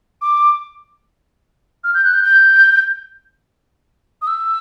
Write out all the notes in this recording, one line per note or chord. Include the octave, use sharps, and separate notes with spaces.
D6
F6
G6
F#6
G6
G6
D#6
E6